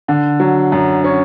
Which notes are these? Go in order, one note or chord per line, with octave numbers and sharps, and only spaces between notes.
D3
F#3
F#2
C#4